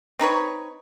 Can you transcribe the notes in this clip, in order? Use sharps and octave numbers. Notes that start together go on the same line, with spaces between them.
C4 D#4 B4 C#5